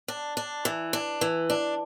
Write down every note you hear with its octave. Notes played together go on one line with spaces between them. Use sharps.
D4
D4
E3
D4
E3
D4